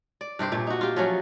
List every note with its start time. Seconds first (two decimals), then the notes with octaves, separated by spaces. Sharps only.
0.21 D5
0.39 G2 C3 G4 C5
0.52 A#2 A3
0.67 D#4 F#4
0.81 F4 G4
0.96 F3 F#3 A3 C#4